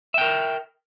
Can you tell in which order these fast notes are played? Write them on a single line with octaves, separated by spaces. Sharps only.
E5 G5 A#4